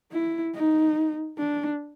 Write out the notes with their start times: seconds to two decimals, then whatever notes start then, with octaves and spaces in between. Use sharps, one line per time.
0.12 E4
0.54 D#4
1.37 D4